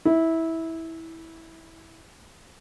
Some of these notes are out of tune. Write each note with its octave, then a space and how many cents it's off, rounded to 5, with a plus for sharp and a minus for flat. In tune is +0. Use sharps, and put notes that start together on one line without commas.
E4 -15